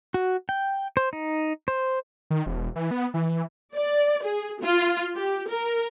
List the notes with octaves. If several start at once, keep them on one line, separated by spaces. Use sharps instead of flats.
F#4
G5
C5
D#4
C5
D#3
E1
E3
B3
E3
D5
G#4
F4
G4
A#4